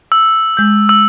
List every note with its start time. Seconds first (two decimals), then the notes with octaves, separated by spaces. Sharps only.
0.12 E6
0.57 G#3 G6
0.89 E6